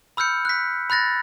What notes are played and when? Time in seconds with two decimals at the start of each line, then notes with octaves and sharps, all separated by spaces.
0.17 B5 E6 F6 G6 C#7
0.45 F#6 B6
0.90 B5 F#6 A6 A#6